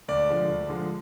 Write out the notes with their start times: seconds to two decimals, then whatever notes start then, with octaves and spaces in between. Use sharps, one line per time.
0.08 D2 D5
0.29 D3 F3 G#3
0.49 D2
0.69 D3 F3 G#3